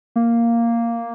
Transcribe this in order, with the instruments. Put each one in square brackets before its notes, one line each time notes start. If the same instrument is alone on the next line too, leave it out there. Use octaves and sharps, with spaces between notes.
[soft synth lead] A#3